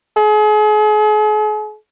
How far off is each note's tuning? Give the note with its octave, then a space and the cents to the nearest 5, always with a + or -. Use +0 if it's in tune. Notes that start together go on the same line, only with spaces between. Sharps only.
G#4 +40